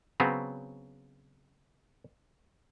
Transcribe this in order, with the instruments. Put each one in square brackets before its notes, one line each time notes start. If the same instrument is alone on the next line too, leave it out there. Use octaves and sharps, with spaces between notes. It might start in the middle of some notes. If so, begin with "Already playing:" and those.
[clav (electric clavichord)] C#3 F#3 B3 C4